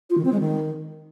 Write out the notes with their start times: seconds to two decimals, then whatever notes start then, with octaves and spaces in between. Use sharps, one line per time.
0.10 F4
0.18 D#3
0.25 C4
0.32 G#3
0.40 D#3